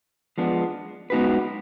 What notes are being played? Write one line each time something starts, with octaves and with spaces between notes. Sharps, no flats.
F3 G#3 B3 D4
G#3 B3 D#4 F#4 B4